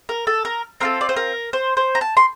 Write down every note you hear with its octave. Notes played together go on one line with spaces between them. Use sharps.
A#4
A4
A#4
C4 F4 A4 A#4
D5
C5
A#4
C5
C5
A#5
A5
C6